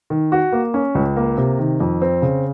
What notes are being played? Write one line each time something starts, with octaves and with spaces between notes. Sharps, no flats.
D#3
F#4
A#3
C#4
C#2
A#3
C3
D#3
F2
C4
C#3